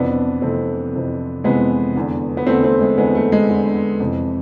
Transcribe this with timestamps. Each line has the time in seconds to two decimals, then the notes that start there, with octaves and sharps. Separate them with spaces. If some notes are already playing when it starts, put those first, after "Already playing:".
Already playing: F2 C3 E3 B3 D4
0.42 F2 C3 E3 A3 C4
0.93 F2 C3 E3
1.44 F2 C3 E3 G#3 B3
1.96 E2 D3
2.37 B3
2.47 E2 A3 C4
2.50 D3
2.64 A3 C4
2.81 G#3
2.98 E2 D3 G#3 B3
3.15 A3
3.32 G#3
3.49 E2 D3
4.00 F2 C3 E3